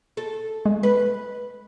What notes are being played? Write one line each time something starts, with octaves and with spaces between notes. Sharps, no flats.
A4
G#3
B4